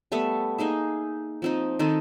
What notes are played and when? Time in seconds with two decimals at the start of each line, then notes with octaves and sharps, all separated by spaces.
0.12 G3 A3 B3 E5
0.58 A#3 D#4 G#4 E5
1.42 F3 C4 D#4
1.79 D#3 C4 D#4 A4